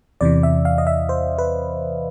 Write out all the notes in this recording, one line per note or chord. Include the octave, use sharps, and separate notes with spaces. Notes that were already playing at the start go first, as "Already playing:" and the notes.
E2 C3 E3 D5
E5
F5
D#5
E5
C5
B4